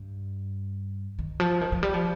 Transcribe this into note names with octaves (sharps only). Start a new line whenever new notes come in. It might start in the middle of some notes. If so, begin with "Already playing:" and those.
Already playing: G2
D#3
F3
D#3
F3
G3
F3